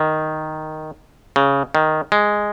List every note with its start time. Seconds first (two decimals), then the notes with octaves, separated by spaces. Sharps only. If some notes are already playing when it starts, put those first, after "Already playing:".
Already playing: D#3
1.36 C#3
1.75 D#3
2.12 G#3